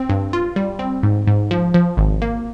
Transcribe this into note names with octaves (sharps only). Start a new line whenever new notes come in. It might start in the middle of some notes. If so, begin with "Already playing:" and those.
Already playing: C4
G2
F4
G3
C4
G#2
G#2
F3
F3
G#1
A#3